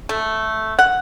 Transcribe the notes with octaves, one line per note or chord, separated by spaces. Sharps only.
A3
F#5